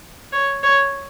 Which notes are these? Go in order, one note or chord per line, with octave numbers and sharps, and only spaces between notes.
C#5
C#5